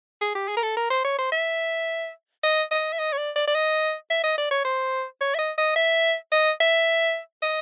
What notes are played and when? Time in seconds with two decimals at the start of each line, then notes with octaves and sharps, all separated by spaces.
0.21 G#4
0.35 G4
0.48 G#4
0.57 A#4
0.63 A4
0.77 A#4
0.90 C5
1.04 C#5
1.19 C5
1.32 E5
2.44 D#5
2.71 D#5
2.93 E5
2.99 D#5
3.13 C#5
3.18 D5
3.36 D5
3.47 D5
3.55 D#5
4.10 E5
4.24 D#5
4.38 D5
4.51 C#5
4.65 C5
5.21 C#5
5.35 E5
5.39 D#5
5.58 D#5
5.76 E5
6.32 D#5
6.60 E5
7.42 D#5